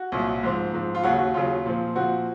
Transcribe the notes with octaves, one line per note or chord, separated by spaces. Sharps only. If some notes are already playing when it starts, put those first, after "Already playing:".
Already playing: F#4
C2 A#2 F#3
G#2 F3 C4
G#2 F3 C4
F4
D#2 C#3 F#3 F#4
F#4
D#2 C#3 F#3 F4
A#2 F3 C4
A#2 F3 C4 F#4